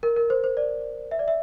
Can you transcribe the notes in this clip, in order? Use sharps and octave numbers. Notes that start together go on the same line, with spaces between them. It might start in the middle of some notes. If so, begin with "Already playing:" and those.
A#4
A#4
C5
C5
D5
E5
D5
E5